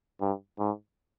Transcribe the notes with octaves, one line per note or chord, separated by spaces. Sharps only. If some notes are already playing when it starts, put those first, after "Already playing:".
G2
G#2